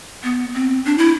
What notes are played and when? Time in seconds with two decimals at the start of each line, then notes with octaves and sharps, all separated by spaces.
0.23 B3
0.54 C4
0.86 D4
0.98 E4